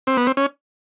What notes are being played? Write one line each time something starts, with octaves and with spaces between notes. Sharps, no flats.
C4
B3
C4
C#4